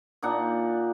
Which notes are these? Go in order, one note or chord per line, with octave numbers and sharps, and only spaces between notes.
A#2 D4 D#4 F#5